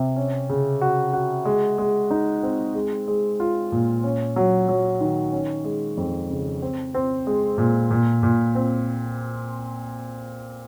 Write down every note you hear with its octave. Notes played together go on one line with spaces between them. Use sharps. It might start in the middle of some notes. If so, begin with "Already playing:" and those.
Already playing: C3
C#4
C#3
F#4
F#4
G#3
G#3
D#4
C4
G#3
G#3
F4
A#2
C#4
F#3
F#3
D#3
C#4
G#3
F2
C#3
C4
C4
G#3
A#2
A#2
A#2
C4